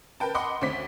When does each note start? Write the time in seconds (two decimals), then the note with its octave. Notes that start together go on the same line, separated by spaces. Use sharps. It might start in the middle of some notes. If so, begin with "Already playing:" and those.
0.20 A#4 B4 G5 A5
0.34 D#5 F#5 B5 C6 D6
0.62 D2 C4 C#5 B6